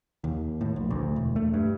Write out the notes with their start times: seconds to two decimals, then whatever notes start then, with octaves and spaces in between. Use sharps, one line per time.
0.24 D#2
0.61 A2
0.76 A#1
0.91 D2
1.16 E1
1.36 A3
1.54 G2